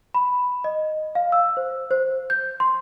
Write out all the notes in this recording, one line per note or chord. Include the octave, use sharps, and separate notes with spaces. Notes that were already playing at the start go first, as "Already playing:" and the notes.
B5
D#5
F5
E6
C5
C5
G6
C6